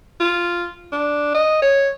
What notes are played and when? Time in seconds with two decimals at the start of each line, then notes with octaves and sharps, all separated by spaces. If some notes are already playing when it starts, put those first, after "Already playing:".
0.20 F4
0.92 D4
1.34 D#5
1.62 C#5